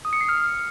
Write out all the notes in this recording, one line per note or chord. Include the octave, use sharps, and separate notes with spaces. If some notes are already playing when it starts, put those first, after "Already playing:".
D#6
C#7
C7
F6